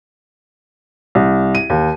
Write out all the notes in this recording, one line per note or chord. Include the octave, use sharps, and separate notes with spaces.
C2
D#7
D#2